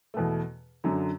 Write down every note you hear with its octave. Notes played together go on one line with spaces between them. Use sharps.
E2 B2 A3
F#2 D3 F#3